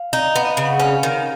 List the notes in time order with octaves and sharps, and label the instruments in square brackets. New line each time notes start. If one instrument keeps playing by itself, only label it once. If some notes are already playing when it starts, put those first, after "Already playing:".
Already playing: [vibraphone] F5
[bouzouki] D#4
B3
[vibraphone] D#5
F5
[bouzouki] C#3
[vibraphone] F#5
[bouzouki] C#4 [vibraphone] F5
[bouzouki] D#3